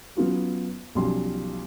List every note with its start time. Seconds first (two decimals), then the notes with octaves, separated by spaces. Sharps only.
0.16 F#3 B3 C#4 F4 F#4
0.95 B1 F3 G3 C#4 C6